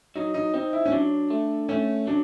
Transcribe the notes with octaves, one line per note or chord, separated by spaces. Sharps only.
F#3 D#4
D#4
C4 D#4
E4
C#4
F#3 D4
A3
A3 C#4
F#3 D4